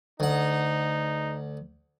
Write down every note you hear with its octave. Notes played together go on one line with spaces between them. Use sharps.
D2 D#4 F#5